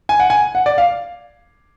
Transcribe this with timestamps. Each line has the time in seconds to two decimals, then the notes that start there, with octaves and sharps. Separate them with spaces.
0.09 G#5
0.20 F#5
0.30 G#5
0.55 F#5
0.66 D5
0.78 F5